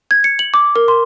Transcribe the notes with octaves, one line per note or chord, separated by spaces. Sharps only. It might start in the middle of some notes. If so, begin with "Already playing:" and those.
G#6
C#7
F#7
D6
A#4
C6